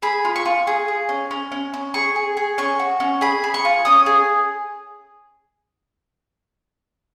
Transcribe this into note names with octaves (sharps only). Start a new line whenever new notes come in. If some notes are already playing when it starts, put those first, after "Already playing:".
G#4 B5
F4
C#6
F4
G#4
G#4
C#4
C#4
C#4
C#4
G#4 C#6
G#4
G#4
C#4 C#6
F#4
C#4
G#4 B5
G#4
C#6
F4
C#4 D#6
G#4